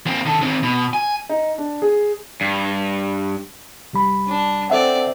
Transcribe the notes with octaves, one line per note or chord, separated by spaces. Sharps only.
A#3 C4
D#3 A4
D#3 C4
B2
G#5
D#4
D4
G#4
G2
C2 G3 B5
D4
C4 A4 D5 E5 F#5